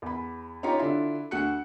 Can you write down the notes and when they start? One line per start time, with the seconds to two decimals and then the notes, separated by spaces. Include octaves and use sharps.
0.02 E2 B5
0.63 C#4 D#4 F4 G4 C#5 A#5
0.78 D3 D4 E4 F4
1.31 D2 F#4 F#6 C#7